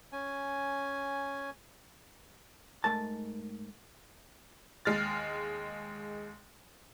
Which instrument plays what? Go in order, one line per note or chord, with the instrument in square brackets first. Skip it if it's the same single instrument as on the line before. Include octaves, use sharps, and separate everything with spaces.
[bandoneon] C#4 G#5
[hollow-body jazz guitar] G#2 A3 A#4 A5
[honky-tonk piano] D#2 G#3 F6 A6